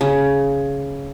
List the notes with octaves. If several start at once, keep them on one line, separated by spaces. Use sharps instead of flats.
C#3